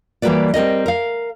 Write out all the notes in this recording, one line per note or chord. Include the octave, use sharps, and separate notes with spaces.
E3 G3 A#3 F#4 B4 D5
G3 C4 A#4 D#5
A#4 F5